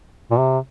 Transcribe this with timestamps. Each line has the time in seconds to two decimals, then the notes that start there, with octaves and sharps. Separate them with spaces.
0.31 A#2
0.38 C3